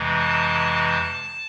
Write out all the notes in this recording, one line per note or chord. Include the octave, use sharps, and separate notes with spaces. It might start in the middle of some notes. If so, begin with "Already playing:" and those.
Already playing: F2 C3 E3 G#3
A5